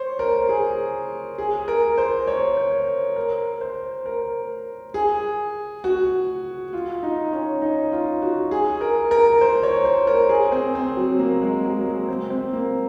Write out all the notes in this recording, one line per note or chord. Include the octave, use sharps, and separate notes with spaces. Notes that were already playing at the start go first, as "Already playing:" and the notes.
Already playing: C5 C#5
A#4
G#4
G#4
A#4
C5
C#5
C5
A#4
C5
A#4
G#4
F#4
F4
D#4
C#4
D#4
F4
F#4
G#4
A#4
A#4
C5
C#5
C5
A#4
G#4
C4
C4
F#3
A#3
G#3
F#3
A#3
G#3
C4
C4
A#3